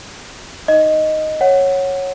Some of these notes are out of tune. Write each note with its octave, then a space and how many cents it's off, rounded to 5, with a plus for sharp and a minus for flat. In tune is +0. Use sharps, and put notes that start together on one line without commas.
D#4 +0 D#5 +0
C#5 -10 F#5 +0